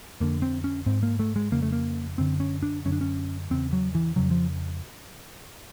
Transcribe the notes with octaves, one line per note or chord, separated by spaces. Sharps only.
F2 D3 A#3
C4
C#4
G#2 C4
A#3
A3
G#3
F2 C#3 A#3
A3
A#3
F#2 D3 C4
C#4
D4
F#2 D3 C#4
D4
C#4
E2 C#3 C4
F#3
E3
F2 C#3 F#3
F3